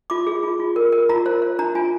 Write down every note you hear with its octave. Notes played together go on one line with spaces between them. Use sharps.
F4 D6
G#4
F4
F4
A#4
A#4
F4 A#5
C5
C5
D4 A#5
F4 G#5